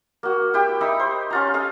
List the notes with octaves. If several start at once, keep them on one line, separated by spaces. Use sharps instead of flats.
A#3 F#4
E4 G4 G5
D#4 E5 B5
C5
C#4 F4 A#5
A4 D#5 F5